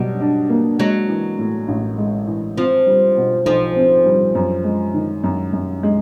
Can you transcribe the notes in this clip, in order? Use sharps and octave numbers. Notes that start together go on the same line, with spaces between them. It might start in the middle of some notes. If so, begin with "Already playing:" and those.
Already playing: B2 F#3 G3
D4
A#3
F#3 G#3
E3
A2
A1
G#3
E3
F3 C4
G3
B2
B1 F3
C4
G3
F#2
G#3
D#3
F#2
F#2
G#3